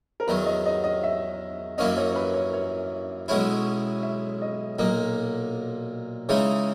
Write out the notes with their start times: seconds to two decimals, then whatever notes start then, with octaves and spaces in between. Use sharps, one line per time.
0.20 A#4
0.27 E2 D#3 F#3 B4
0.46 D#5
0.66 D#5
0.84 D#5
1.03 E5
1.78 F#2 E3 A#3 C#4 D#5
1.97 C#5
2.10 C#5
2.16 B4
2.34 C#5
2.53 C#5
3.28 B1 B2 G#3 C#4 E4
4.03 E5
4.42 D#5
4.79 B1 A#2 A#3 D#5
6.29 C#3 E3 G#3 D#4 C#5